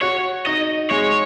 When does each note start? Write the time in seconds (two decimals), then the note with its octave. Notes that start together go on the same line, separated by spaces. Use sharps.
0.01 F#4 C#5
0.46 D#4 D#5
0.91 G#3 C#5